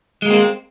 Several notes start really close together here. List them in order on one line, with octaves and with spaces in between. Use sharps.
G#3 A#3 C4